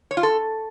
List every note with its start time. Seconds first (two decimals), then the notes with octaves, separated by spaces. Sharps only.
0.11 C#5
0.17 F4
0.23 A4